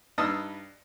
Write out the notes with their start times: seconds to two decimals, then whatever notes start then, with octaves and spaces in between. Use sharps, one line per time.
0.18 G2 D#4 B4 A5 D#6 E6